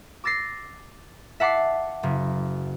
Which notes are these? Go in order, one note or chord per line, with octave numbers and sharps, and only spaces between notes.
D6 E6 A6 A#6 C7
E5 F#5 A5 D6 C7
F#1